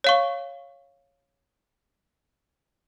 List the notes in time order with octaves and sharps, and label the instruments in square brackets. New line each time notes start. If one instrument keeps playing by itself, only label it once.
[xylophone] C#5 F5 C#6